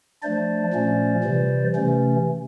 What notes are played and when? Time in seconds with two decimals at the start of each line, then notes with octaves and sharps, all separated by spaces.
0.22 F3 A3 D4 C5 D5
0.73 A#2 F3 A3 C#4
1.24 C3 E3 G3
1.75 C3 E3 A3 C#4